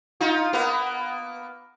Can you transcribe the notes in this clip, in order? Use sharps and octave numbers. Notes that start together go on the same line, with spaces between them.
D#4 F4
A#3 B3